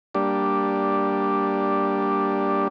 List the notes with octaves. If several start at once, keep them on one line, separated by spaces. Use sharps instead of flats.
G3 A#3 D4 G4